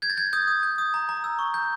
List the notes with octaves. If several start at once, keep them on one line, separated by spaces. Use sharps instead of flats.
G6 G#6
A6
G6 G#6
D#6 G6
D#6
G6
D#6
A#5
A#5
E6
C#6
G6